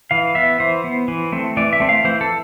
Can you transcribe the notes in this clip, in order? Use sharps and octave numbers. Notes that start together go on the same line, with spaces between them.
E3 F5
B3 E5
E3 C5
B3
E3
A3 C4
E3 D5
E5
A3 C4
F5
E3 C5
A4